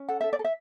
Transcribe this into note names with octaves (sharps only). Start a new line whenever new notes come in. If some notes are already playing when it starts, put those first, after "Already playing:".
Already playing: C#4
A4 F#5
A4 E5
D5
A4
E5